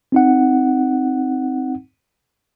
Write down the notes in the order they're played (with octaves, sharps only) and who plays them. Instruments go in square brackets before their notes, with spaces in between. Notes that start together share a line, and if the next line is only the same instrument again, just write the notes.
[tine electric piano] C4 D#4 F#5